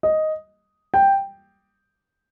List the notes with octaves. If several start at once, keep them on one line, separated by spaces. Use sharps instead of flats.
D#5
G5